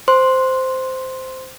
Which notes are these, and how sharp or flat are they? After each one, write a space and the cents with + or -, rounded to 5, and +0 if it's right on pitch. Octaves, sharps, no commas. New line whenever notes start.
C5 -10 C6 +0